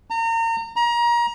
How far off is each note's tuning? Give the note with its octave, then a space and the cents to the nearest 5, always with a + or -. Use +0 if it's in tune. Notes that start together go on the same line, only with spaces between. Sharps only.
A#5 -35
A#5 +30